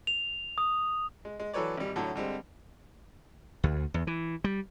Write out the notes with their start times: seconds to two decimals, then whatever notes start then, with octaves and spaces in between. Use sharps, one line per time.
0.07 F7
0.58 D#6
1.25 G#3
1.40 G#3
1.53 E3 F#3 A4 B4 C#5 D5
1.77 G#1 G3
1.96 A2 D3 F#3
2.16 D3 G3 G#3 C4
3.64 D2
3.94 E2
4.07 E3
4.44 G3